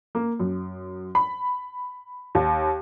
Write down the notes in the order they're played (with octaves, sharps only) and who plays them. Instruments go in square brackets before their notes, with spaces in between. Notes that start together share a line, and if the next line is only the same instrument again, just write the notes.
[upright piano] A#3
F#2
B5
D#2